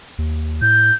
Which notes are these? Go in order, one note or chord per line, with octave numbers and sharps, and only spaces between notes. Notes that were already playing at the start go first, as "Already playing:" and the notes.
D#2
A2 G6